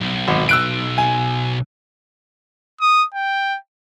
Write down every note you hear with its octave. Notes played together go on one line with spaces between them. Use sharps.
B1
G#1
E6 F#6 D7
G#5
D#6
G5